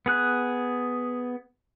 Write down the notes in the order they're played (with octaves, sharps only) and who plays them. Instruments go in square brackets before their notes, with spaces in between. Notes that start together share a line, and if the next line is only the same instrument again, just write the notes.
[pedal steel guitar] B3 G#4 F#6